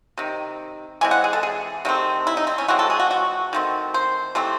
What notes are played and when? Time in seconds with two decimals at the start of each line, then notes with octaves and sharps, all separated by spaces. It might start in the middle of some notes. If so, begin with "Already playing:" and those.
0.18 C3 D#3
1.01 E3 G#3 C4 G#5
1.11 F#5
1.24 G#4
1.33 A4
1.43 G#4
1.85 C3 D#3 A3 C4
2.27 E4
2.37 D#4
2.47 C4
2.58 C#4
2.68 E3 G#3 C4 F#4
2.79 A4
2.90 G#4
3.00 F#4
3.11 F#4
3.53 D#3 A3 C4
3.94 C5
4.35 C3 E3 A3 C4